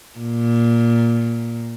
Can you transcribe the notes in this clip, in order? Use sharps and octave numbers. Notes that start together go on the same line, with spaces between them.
A#2